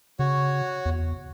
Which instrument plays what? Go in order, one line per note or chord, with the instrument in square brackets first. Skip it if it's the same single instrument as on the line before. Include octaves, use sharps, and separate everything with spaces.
[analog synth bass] C#3 [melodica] F#4 C#5
[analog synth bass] E2